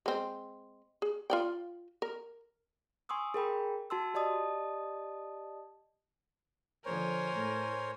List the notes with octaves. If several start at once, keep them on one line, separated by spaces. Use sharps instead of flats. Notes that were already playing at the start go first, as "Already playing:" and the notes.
G#3 C4
G#4
F4 D5 G5
A#4
G#5 C6 C#6 D#6 E6
G#4 A#4 G5 B5
F#4 A5 C6 E6
G4 D5 D#5 A5 D#6
D3 F3 A#4 C5 C#5 G#5
A2 A3